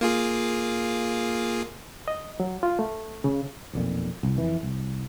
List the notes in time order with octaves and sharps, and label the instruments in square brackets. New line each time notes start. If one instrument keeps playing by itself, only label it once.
[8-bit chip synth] A#3 F4 G#4
[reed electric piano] D#5
F#3
F4
A3
C#3
[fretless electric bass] B1 F2 A#2
C2
F2 E3
C2